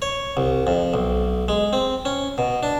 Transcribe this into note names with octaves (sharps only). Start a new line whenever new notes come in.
C#5
C2
F2
B1
G#3
C4
C#4
B2
D4